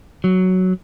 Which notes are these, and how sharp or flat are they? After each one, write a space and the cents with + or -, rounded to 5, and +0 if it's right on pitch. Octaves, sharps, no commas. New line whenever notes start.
F#3 +5